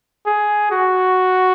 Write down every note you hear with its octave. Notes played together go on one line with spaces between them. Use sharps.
G#4
F#4